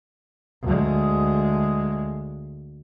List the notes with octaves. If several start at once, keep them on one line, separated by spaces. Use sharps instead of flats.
D2 G#3